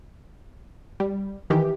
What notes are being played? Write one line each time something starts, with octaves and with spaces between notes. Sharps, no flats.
G3
D#3 E3 G4